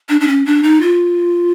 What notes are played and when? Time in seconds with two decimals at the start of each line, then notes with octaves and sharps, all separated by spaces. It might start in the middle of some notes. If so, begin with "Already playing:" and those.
0.09 D4
0.20 D4
0.27 C#4
0.45 D4
0.63 D#4
0.81 F4